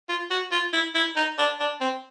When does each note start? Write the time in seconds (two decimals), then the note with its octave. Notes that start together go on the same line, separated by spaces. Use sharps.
0.09 F4
0.31 F#4
0.52 F4
0.73 E4
0.95 E4
1.16 D#4
1.38 D4
1.60 D4
1.81 C4